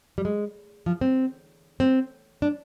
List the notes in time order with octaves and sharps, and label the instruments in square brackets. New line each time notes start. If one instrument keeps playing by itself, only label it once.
[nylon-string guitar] G3
G#3
F3
C4
C4
D4